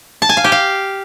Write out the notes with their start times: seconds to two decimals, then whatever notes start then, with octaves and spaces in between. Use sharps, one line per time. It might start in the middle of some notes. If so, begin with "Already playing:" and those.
0.22 A5
0.29 G#5
0.37 F5
0.44 G4
0.52 F5